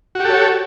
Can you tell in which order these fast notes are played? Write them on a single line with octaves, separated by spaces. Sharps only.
F#4 G4 A4 C#5